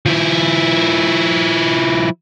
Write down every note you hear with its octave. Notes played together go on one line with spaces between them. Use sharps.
F3 E4